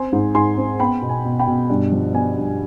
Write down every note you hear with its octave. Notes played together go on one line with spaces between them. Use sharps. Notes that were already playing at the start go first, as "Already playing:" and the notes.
Already playing: C4 G#5 C6
G#2
G#2 G#5 C6
C4
B3 G5 B5
B2
G#5
B2
G5 B5
B2
G2
F3
B3 G#5
G2